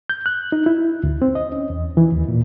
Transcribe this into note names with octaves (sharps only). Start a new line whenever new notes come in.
G6
F#6
D#4
E4
D2
C4
D#5
C#4
E2
E3
D#2
A#2